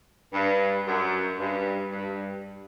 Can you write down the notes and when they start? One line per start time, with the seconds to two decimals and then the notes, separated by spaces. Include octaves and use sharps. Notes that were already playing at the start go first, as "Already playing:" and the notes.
0.33 G2
0.87 F#2
1.39 G2
1.91 G2